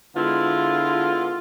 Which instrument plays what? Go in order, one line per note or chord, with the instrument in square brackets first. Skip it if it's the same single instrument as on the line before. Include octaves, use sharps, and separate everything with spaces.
[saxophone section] D3 G#3 B3 E4 F4